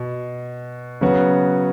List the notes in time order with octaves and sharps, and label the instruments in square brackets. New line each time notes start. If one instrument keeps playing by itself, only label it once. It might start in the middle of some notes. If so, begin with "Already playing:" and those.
Already playing: [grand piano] B2
C#3 F#3 B3 F#4